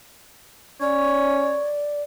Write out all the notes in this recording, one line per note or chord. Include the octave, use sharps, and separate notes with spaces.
C#4 C#5 D5